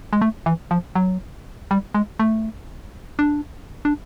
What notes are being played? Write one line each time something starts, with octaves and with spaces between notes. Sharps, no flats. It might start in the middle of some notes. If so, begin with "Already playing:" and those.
G#3
A3
E3
F3
F#3
G3
G#3
A3
D4
D4